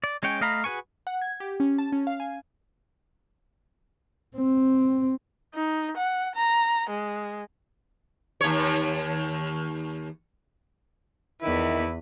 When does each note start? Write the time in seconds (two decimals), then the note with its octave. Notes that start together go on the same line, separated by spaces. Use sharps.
0.04 D5
0.23 G#3 C#4 C#5 G5
0.41 A3 D#5 F5 A#5 B5
0.64 F#4 G#4 B4 G#5 C#6
1.07 F#5
1.22 G#6
1.40 G4
1.60 C#4
1.78 A5
1.92 C#4
2.07 F5
2.20 G#5
4.36 C4
5.55 D#4
5.97 F#5
6.35 A#5
6.90 G#3
8.41 D#2 C#5
11.42 E2 D#3 E4 B4